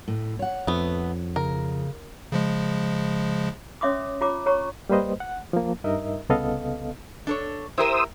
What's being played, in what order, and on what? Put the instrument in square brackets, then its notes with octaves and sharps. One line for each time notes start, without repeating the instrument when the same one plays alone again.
[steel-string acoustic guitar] A2
C#5 F#5
[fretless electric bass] F2 [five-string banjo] A3 B3
[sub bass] C#3 [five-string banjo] A#4
[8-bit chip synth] C#3 F3 G#3
[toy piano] C#4 C#5 E5 C6 D6 D#6
F4 C#5 A#5 D6
C#5 A#5 C#6
[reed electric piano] G3 A#3 B4 C5 D#5
F#5
F3 A#3
G2 D#4 A#4 D#5 E5
C2 C#3 B3 A4 D#5 F5
[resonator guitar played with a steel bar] D4 A4 C#5
[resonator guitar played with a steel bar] E4 G4 A#4 [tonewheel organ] C5 D#6 E6